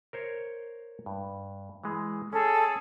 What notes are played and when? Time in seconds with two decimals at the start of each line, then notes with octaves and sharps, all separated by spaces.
0.13 A#4 C5 C#5
1.06 G2
1.84 E3 G#3
2.33 C#4 G#4 A4